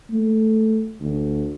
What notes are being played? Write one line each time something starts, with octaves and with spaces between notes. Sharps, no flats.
A3
D2